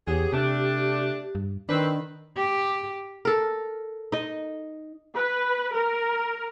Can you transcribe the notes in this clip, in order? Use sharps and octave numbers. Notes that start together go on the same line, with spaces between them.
E2 B3 C#4 G4 G#4
C3 A3 D4
G2
D#3 C4 D4 B4
G4
A4 A#4
D#4 D#5
B4
A#4